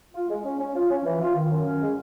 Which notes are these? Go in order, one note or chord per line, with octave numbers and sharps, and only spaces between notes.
F4
G#3
C#4
C#4
F4
C#4
E3
F4
D#3
F#2
C#4
G#3